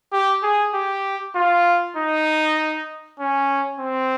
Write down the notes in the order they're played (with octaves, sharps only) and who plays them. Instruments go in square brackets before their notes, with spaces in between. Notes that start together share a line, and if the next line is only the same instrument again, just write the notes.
[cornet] G4
G#4
G4
F4
D#4
C#4
C4